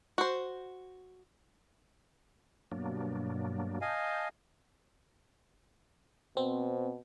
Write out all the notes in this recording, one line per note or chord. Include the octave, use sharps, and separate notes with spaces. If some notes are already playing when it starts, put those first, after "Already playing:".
F#4 C5
G2 B2 F#3 A#3 D4
D#5 F5 G#5 A5 G6
B2 C4